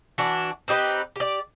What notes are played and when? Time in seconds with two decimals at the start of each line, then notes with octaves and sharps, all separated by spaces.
0.18 E3 D4 F#4
0.68 C4 D#4 G4 B4
1.16 G4 D5